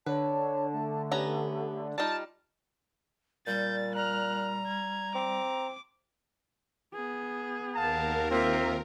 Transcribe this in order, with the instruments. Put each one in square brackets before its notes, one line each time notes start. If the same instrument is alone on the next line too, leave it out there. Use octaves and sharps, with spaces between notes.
[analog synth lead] D3 [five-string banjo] B4 [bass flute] C#5 [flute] A5
[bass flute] A3
[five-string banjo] B3 C#4 A#5 [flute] G4
[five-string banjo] G3 D#4 [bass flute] F4 [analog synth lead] A5 [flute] F6
[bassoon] A#2 [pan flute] G3 [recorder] G6 [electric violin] A6
[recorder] A#5 [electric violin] F6 F#6
[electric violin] G#6
[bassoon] C4 [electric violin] D6
[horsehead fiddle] B3 G#4
[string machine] D#2 A#4 [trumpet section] F5 F#5 A5
[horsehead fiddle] A#3 E5 [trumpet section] C4 F4